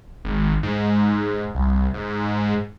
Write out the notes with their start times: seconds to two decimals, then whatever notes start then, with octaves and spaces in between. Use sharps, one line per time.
0.25 G#1
0.63 G#2
1.55 C2
1.94 G#2